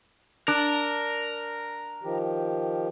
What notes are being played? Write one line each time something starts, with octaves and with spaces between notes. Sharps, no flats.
D4 A#4
D#3 F3 G4